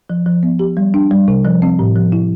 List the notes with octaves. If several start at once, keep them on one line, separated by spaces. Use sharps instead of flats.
F3
F3
B3
G4
G3
D4
G3
C3
F3
C4
A2
F3
E4